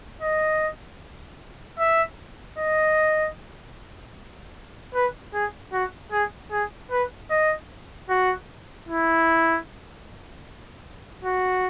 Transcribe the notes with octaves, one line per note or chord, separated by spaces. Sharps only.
D#5
E5
D#5
B4
G#4
F#4
G#4
G#4
B4
D#5
F#4
E4
F#4